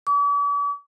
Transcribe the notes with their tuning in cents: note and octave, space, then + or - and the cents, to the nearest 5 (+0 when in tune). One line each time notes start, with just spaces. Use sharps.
D6 -45